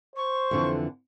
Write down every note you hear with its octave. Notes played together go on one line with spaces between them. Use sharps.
C5 C#6
F2 D3 E3